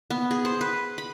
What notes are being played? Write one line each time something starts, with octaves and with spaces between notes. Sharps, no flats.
B3
G#4
C5
B4
B5